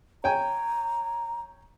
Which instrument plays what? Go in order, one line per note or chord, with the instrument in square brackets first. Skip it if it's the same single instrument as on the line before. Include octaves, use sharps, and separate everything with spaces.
[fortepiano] C#5 G5 G#5 [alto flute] A#5